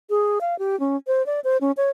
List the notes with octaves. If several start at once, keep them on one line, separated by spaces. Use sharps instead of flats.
G#4
F5
G4
C#4
C5
D5
C5
C#4
C#5